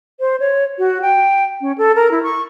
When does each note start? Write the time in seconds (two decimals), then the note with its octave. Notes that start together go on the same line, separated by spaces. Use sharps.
0.20 C5
0.40 C#5
0.78 F#4
1.02 G5
1.61 C#4
1.78 A4
1.95 A#4
2.11 E4
2.23 C#6